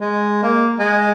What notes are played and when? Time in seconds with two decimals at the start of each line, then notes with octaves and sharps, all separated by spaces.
0.01 G#3
0.43 A#3
0.79 G#3